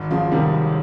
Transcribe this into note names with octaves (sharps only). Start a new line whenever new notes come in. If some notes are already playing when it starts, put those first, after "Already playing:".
Already playing: G#1
C#3 F3
C3 D#3 G3